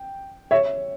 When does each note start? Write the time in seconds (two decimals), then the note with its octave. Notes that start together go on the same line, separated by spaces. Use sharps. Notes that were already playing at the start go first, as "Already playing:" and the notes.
Already playing: G5
0.51 C#5 E5